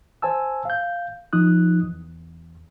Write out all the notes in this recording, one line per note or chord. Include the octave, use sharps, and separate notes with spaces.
C5 G#5 A5 E6
F5 G6
F3 D#4 D#6 F#6
E2